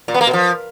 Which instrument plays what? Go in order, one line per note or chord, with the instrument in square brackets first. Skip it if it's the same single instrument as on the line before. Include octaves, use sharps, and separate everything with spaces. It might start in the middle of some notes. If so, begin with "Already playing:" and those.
[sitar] A#2
B3
A#3
B2
F3